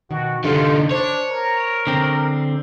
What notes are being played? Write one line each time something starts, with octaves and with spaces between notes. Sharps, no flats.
B2 D#3 F#4
D3 G3 D#4 F4 A4 C#5
D4 C5 C#5
A#4
D3 C4